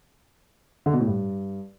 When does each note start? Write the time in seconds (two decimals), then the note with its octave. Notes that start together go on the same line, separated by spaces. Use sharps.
0.86 D3
0.93 B2
1.00 A2
1.07 G2